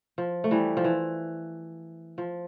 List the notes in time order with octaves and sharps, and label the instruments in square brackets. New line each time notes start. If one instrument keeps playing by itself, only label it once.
[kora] F3
A3
E3 G3
F3
E3
F3